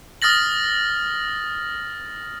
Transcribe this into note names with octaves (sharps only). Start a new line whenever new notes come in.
D#6 F6 A6 A#6 F#7